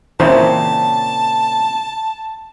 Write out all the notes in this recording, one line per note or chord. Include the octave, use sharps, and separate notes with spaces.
A#2 C#3 E3 C4 C5 E5 A5